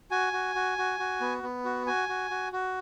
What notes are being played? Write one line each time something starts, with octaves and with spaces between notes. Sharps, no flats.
F#4 G#5
F#4
F#4
F#4
F#4
B3
B3
F#4
F#4 G#5
F#4
F#4
F#4